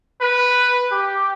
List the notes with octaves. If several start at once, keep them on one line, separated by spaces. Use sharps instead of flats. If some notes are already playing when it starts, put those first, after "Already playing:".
B4
G4